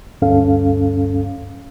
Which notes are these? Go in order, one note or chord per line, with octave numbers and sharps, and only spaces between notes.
D2 G2 C#4 A4 F5